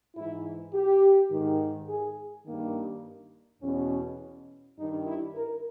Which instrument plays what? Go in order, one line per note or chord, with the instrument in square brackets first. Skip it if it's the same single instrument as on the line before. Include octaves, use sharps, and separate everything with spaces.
[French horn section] G#2 E3 E4
G4
G#2 D#3
G#4
G2 D#3 A#3
E2 B2 C#4
G2 D#3 D#4
E4
A#4